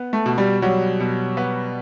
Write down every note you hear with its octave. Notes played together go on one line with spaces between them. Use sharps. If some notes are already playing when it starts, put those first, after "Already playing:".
Already playing: B3
A3
B2
G3
F#3 G3
B2
B3